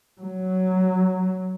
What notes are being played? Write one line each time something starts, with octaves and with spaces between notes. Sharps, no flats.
F#3